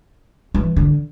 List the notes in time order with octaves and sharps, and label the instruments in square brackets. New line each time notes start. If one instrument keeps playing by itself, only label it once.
[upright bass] E3
D3